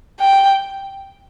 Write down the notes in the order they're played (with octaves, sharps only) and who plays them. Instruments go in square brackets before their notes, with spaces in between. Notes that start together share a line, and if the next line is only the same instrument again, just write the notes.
[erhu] G5